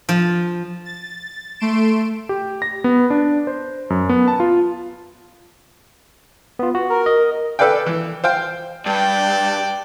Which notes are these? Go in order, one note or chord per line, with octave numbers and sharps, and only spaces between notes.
F3
A6
A3 C6 D7 E7
G4
A#6
B3
D4
C5
F#2
B3
A5
F4
B3 F4
F#4
A#4
D#5
A4 B4 D5 F5 G5
E3
C5 F5 G5
G2 D5 G5 A5